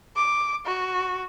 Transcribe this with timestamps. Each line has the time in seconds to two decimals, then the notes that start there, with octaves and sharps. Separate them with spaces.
0.16 D6
0.66 F#4